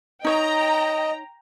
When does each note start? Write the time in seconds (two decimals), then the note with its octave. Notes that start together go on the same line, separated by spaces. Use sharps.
0.25 D#4 C#5 D#5 G5 A#5